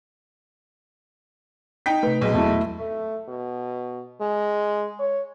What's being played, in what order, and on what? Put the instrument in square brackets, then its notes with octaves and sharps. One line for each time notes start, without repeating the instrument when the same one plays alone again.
[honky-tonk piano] D#4 G5 B6
[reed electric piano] C3 A3 [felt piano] B4
[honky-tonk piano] B1 G#3 [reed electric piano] A#2 F#3
[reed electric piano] E2 F#3 [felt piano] A3 E4
[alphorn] A3
B2
G#3
C#5